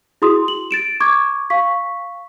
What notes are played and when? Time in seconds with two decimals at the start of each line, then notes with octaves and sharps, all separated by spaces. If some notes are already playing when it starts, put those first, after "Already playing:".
0.22 E4 F#4 G#4 C6 D#6
0.48 F#7
0.71 A6 D7 E7
1.00 C#6 D6 G#6
1.50 F5 C#6 B6